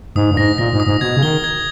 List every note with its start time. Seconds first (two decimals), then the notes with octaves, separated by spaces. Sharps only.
0.16 G#2 D#6
0.31 G2
0.37 G#2 A#6
0.58 A#2 A#6
0.73 G#2
0.80 D#6
0.87 G#2
1.01 B2 G#6
1.17 C#3
1.23 D#3 G7
1.44 G#6